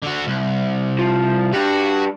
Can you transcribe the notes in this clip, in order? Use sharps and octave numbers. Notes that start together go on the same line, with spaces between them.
D3 F#4
C2
F3
G3 D4 F#4